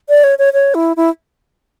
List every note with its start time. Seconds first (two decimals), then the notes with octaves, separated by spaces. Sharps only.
0.09 D5
0.24 C#5
0.39 C#5
0.53 C#5
0.74 E4
0.96 E4